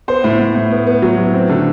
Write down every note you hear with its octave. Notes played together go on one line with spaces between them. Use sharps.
B3 C5
A2
A2
A2
B3
B3
F#3
A2
C4
D3